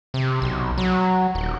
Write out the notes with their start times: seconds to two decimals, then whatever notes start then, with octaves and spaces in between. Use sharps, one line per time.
0.14 C3
0.42 B1
0.78 F#3
1.35 D#1